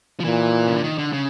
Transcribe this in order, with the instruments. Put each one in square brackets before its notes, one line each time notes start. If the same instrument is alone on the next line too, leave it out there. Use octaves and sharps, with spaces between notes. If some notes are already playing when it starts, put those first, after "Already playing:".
[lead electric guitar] F3
[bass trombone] A#2 [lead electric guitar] E3
[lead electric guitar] C#3
D3
D#3
D3
C#3